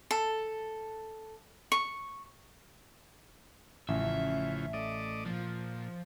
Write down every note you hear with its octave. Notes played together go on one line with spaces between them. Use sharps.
A4
C#6
A1 C#3 E3 F3 E5
A3 D5 D#5
A#2 F3